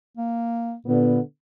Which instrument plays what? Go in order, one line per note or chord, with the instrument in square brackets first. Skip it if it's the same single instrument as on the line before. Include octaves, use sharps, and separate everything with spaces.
[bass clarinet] A#3
[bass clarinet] A#2 [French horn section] D3 B3